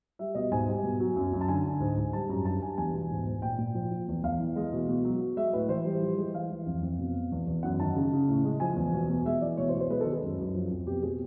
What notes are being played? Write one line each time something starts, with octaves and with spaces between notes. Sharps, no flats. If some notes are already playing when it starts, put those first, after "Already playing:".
G3 E5
B2 D#5
G#2 G#5
G3
B2
F#3
F#2
F#2
A5
D3 G#5
D3
G#2
G#2
G3 A5
F#2 A#5
G2 A5
G2 G#5
E2 G#5
B2
G#2
G#2
A#2 G5
A#2
F3
F3
E2
E2 F5
E3
G#3
B2
B2
F#3
F#3
G#3 E5
A2 B4
E3 C5
G3
F3
G#3
E3 F5
E3
F2
F2
B2
B2
E2
E2
F#2 F#5
D#3 A5
C#3
C#3
A2
G#3
F3 G#5
E2
B2
B2
G#3 E5
E3 D5
B2 C#5
C5
B2
C5
G#3 B4
A4
D#3
G#4
F#2
F#2
F3
F2
B2 G4
B2 G#4